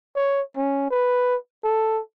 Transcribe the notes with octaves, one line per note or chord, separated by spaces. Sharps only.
C#5
C#4
B4
A4